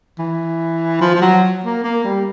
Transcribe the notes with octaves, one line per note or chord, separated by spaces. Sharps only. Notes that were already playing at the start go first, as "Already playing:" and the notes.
E3
F3
F3
F#3
A#3
A#3
G3